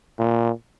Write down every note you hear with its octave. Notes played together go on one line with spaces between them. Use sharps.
A#2